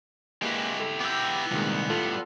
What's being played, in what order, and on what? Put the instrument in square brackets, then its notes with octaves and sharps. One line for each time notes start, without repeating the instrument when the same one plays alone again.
[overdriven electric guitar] G#3 B4 [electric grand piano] A#3 [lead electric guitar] E4 G4
[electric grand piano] A4
[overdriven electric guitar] B3 G5 [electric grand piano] D6 E6
[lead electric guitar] C2 [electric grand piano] A#2 D#3 G#3
[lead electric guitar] A2 G3 [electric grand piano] F4 A4